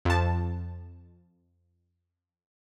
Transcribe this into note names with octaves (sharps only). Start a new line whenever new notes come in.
F2 A5